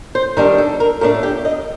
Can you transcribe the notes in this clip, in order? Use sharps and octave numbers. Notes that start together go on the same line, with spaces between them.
C5
D#3 G3 D4 A#4
A4
A#4
A2 A3 D4 A#4
G4
D#5